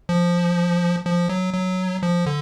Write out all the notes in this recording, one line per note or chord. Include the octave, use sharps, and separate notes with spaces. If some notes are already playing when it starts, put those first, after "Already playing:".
F3
F3
F#3
F#3
F3
D3